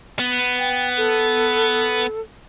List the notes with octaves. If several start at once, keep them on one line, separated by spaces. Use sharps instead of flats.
B3
G5
A4